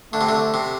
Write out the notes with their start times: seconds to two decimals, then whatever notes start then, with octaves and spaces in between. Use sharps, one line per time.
0.13 D3 A3
0.21 C3
0.29 D3
0.54 C3